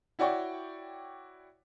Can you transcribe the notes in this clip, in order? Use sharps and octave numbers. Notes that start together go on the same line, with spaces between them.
E4 F#4 C#5 D5 G5 C#6